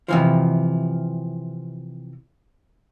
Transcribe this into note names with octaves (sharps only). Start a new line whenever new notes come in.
C3 E3 F3